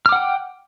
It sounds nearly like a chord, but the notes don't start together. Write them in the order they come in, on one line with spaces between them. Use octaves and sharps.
F6 D6 F#5 G5